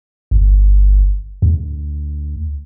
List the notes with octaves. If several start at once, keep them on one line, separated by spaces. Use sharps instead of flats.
G1
D2